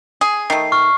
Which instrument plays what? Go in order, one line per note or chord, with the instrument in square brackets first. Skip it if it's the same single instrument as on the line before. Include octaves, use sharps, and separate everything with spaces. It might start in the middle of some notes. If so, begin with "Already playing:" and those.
[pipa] G#4
[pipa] D#3 A3 [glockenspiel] C7
[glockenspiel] C#6 F6